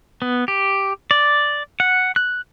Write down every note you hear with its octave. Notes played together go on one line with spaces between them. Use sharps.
B3
G4
D5
F#5
F#6